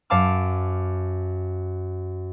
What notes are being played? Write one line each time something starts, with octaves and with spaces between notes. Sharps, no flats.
F#2 F5 A5 D6 F6